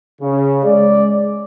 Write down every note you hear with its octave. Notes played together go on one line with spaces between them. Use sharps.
C#3
G#3 D5